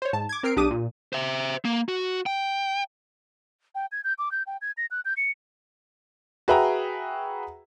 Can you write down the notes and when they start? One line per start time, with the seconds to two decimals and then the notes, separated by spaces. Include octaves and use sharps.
0.02 C5 C#5
0.13 G#2 A5
0.29 D6 G#6
0.43 C4 A#4 F6 C7 D7
0.56 B1 D4 G4 D6 D#6 D#7
0.71 A#2
1.13 C5 E5
1.65 A#3
1.89 F#4
2.26 G5
3.75 G5
3.92 G#6
4.04 G6
4.19 D6
4.32 G6
4.47 G5
4.62 G#6
4.77 A#6
4.91 F#6
5.05 G6
5.17 C#7
6.48 F#4 G#4 B4 E5 G5 A#5